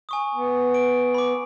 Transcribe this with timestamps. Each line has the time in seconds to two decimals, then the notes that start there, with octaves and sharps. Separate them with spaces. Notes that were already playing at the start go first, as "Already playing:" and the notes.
0.09 G#5 C#6 D#6
0.35 B3
0.74 D7
1.14 B5 D6